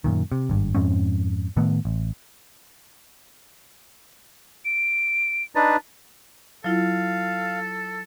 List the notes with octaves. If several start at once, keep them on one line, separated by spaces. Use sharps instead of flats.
F#2 A#2 D#3
C3
G#1 G2
F2 G#2 C4 C#4
A2 D#3 A3 B3
A1
D7
D4 D#4 B4 A6
F#3 E4 F4 A4 F5